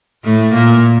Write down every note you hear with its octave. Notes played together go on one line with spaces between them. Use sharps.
A2 A3
A#2 A#3